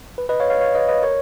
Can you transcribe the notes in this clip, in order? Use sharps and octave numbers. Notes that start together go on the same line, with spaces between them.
B4
B4 D#5
C#5 F5
C#5 F5
C#5 F5
B4 D#5
B4 D#5
A#4 C#5